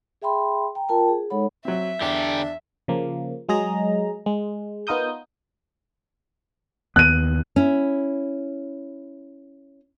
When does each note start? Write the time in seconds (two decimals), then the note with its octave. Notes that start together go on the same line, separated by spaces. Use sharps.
0.22 G#4 E5 G5 B5 C6
0.75 G5 A#5
0.89 F4 A#4 G5 A5
1.08 G#4
1.30 G#3 D#4 A4 C#5 F#5 B5
1.65 F#3 C4 E5
2.01 E2 D3 D4 G4
2.88 C#3 F3 A#3
3.49 F#3 G#3 G#4 D#5 A#5
4.26 G#3
4.87 B3 D#4 F4 A#4 D#6 G6
6.96 D#2 B3 F#6 D#7
7.56 C#4 E4